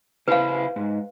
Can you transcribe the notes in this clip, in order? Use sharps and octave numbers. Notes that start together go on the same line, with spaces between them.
C#3 E4 B4 C5 F5
G#2